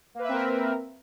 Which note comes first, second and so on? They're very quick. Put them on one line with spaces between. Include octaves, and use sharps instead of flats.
A#3 B4 E5 C4 A#4